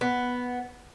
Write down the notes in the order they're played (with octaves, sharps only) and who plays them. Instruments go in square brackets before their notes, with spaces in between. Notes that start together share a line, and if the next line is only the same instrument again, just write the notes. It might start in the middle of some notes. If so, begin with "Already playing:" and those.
[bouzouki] B3